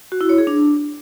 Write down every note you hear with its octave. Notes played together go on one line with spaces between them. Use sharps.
F#4
E4
C#5
G#4
D4